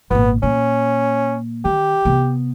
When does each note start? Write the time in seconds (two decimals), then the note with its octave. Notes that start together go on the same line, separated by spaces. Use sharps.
0.11 G#1 A#2 B3
0.43 A#2 C#4
1.65 D#3 G4
2.05 C3 B3